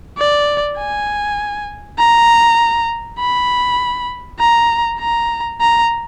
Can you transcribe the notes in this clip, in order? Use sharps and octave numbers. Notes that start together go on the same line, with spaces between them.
D5
G#5
A#5
B5
A#5
A#5
A#5